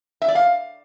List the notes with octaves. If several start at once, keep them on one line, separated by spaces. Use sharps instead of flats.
E5
D5
F5